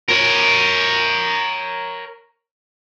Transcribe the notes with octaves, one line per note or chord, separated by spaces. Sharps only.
A#4 C#5